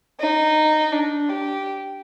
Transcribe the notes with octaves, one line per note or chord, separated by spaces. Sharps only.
D#4
D4
G4